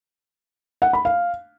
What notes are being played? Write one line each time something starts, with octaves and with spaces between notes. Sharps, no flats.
F#5
B5
F5